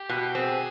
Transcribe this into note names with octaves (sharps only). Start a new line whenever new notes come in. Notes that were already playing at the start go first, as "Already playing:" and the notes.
Already playing: G4
B2
C4 G#4